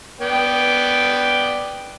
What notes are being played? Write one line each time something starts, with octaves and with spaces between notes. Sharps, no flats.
B3 D5 G5